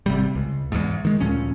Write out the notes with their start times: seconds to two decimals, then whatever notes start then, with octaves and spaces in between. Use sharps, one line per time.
0.06 G#1 C3 G3
0.35 C#2
0.72 E2 G#2
1.05 D#3 G#3
1.20 D2 A#2 F3 C#4